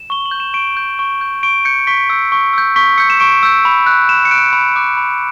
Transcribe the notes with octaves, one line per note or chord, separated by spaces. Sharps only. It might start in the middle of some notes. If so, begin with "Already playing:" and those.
Already playing: E7
C#6 G7
F#7
G6
E7
C#6 D7
G6
C#6
G6
C#6 D7
G6 C#7
C#6 B6
E6 G6
C#6
E6 G6
C#6 B6
E6 G6 C#7
E7
C#6 D7
E6 G6
B5
F#6
B5 E7
C#7
F#6 D7
B5
D6 F#6
B5